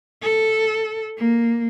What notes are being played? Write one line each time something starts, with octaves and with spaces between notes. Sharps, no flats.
A4
A#3